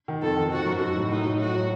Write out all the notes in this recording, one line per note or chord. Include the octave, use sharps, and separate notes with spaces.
D#3
F2 A4
D#3
F3 F#4
F#2
D#4 F#4
A2
A2 D#4
F#3
A2 F#4
F#3